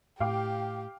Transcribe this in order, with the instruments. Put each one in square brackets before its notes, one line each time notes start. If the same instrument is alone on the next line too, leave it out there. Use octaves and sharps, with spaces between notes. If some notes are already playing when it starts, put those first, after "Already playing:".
[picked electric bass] A2 [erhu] G4 [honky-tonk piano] F5 G5 D6